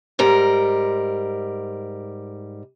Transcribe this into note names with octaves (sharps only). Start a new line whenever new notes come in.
G#2 G3 A#4